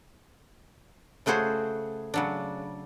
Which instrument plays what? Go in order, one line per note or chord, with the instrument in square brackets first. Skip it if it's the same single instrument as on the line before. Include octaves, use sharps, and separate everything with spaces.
[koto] C#3 A3 F#4 G#4 C5
C#3 F#3 D4